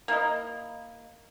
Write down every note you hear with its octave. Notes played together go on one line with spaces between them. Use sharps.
A#3 E4 D#5